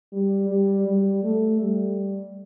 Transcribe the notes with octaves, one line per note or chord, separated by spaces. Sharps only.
G3
G3
G3
A3
G3